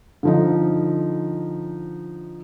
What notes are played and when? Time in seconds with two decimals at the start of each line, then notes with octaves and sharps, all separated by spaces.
0.23 D3 F3 D#4